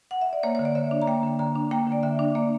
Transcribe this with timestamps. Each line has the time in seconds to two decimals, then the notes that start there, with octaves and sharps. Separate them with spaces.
0.11 F#5
0.21 E5
0.33 D5
0.43 A#3 C#5
0.55 D3 C#5
0.65 D5
0.75 D3 E5
0.91 D4
1.02 A#5
1.07 A#3 G5
1.23 D3
1.39 D3 A#5
1.55 D4
1.71 A#3 G5
1.87 D3 D5
2.03 D3 E5
2.19 D4
2.35 A#3 D5